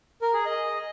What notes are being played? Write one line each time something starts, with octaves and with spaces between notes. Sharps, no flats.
A#4
G#4
D#5